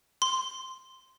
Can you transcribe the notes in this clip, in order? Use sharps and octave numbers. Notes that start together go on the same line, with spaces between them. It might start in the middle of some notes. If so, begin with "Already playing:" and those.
C6